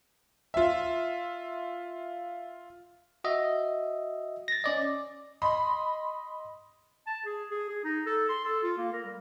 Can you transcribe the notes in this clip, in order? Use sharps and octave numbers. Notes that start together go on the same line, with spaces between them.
F4 E5
F#4 D#5 E5
A6 A#6
C#4 D5 D#5
D#5 B5 C6
A5
G#4
G#4
G#4
D#4
A4
C6
A4
F4
A#3
A#4
G3